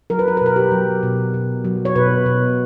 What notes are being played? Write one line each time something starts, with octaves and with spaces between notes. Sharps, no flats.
F#3 A#4
B4
A#4
B4
B2 A#4
G4
F#3
B2
B2
F#3
C#5
B2 B4
B2